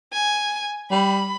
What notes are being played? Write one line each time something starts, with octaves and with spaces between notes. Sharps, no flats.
G#5
G3 B5